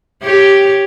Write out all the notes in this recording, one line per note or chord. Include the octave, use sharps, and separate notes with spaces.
G4 C#5